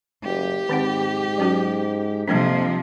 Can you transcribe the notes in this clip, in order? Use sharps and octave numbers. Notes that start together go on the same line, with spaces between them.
F#1 G4
G#2 D#3 C4 F#5
F#3 C#4 F#4
F2 C3 F3 G3 A#3 D4